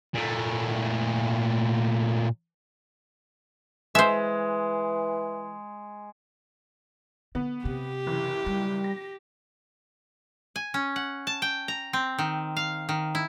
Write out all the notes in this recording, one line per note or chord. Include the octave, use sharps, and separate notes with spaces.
A#2 A3
E3 G#3 C5 E5
D3 B3
C3 G4
F#1 E3
G3 F4
A#6
G#5
C#4
F#5
A5
G5
A#5
C4
D#3
F5
D#3
E4